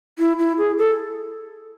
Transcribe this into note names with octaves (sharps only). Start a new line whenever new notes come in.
E4
E4
G#4
A4